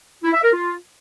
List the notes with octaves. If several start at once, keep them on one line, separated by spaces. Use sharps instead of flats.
E4
E5
A#4
F4